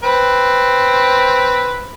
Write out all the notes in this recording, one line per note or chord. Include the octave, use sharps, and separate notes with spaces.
C4 B4